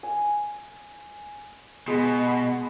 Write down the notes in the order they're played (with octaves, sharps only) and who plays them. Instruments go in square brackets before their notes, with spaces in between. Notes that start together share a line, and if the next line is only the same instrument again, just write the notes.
[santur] G#5
[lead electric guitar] B2 [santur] G#3